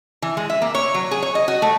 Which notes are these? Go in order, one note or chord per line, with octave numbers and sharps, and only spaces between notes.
E3
G#3
E5
A#3
C#5
F#3
G#4
C#5
D#5
F#4
A3